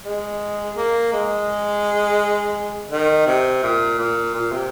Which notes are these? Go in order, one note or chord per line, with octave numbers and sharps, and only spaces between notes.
G#3
A#3
G#3
D#3
C3
A#2
A#2
A#2
C3